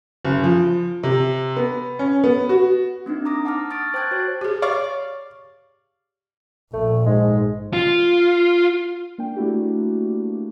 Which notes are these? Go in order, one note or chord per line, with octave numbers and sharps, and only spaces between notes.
F#1
F3
C3
B3
C#4
B3
F#4
A#3 C4 D4 D#4
A#5 D6 D#6 A#6
F#5 A5 D6 D#6 F6 A#6
C#6 D#6 F6 A6 A#6 D7
C5 G5 A5 F#6 G#6 A6
F#4 C5 C#5
G4 G#4
C#5 D5 F5 C#6
A#1 A3
G#2 G#3
F4
A#3 D4 G5
A3 A#3 D4 E4 F#4 G4